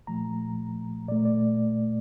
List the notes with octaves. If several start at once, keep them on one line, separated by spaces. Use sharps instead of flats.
A#2 F3 A3 A#5
A#2 A3 D5
D5